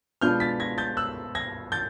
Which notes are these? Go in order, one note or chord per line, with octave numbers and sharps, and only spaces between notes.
B2 G#3 B3 D4 F4 F6 G6
A6 B6
G#6 A#6
G6 A6
E6 F#6
G#6 A#6
G6 A6